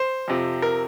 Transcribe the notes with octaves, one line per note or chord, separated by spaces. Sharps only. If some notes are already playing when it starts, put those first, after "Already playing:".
Already playing: C5
F2 C3 F3
A#4